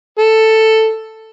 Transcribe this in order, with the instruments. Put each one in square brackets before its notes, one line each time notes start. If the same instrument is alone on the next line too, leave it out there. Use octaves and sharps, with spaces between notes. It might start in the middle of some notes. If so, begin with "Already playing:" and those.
[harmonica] A4